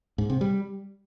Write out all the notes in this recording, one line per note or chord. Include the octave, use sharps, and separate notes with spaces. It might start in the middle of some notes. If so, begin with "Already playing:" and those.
G#2
C3
G3